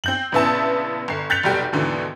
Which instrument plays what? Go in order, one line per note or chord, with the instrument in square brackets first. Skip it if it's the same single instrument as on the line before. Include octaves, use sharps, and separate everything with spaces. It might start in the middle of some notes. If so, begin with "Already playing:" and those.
[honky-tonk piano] C4 G6 F#7
A#1 C#3 B3 E4 A5
G1 C7
F#6 G6 A6 B6 C#7 F7
F1 B1 G3 G5
D#2 G#2 B2 D3 E3